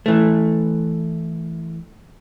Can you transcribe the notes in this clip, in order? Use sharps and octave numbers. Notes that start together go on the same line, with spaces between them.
E3 A3